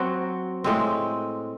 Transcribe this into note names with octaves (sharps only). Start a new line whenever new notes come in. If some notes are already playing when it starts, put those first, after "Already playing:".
Already playing: F#3 C4 F#4
A2 G#3 C4